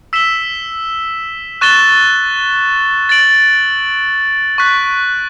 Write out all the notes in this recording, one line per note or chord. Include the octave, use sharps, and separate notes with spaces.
E6 B6 E7 G7
C#6 F#6 A6 E7 G7
A6 D7 F#7
C#6 F#6 B6